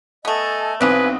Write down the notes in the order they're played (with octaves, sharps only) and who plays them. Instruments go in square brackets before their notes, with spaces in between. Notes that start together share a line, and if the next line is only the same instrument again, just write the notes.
[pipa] A3 B3 [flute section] A4 D#5 G#5
[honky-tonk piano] B1 C4 D#6 [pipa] D3 E3 B3 [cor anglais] B4 [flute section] G#5